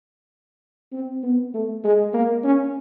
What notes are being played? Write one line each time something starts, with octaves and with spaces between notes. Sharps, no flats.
C4
B3
A3
G#3
A#3
C#4